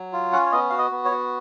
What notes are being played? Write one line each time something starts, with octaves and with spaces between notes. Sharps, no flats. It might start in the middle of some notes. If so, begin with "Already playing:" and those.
Already playing: F#3
F4
C#4 F#5
C#5
B3 D#5
F#4 F5
D#5
B3
C#5
F#4